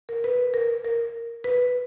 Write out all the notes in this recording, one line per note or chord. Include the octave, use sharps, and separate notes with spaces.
A#4
B4
A#4
A#4
B4